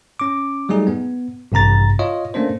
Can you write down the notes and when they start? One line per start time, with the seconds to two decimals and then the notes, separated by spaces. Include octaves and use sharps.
0.20 C#4 D6
0.69 F#3 G3 A3 D#4 G#4
0.87 B3
1.52 A1 G2 C3 A#5 A6
1.99 F4 C#5 D#5
2.34 A3 A#3 C#4 D4 C5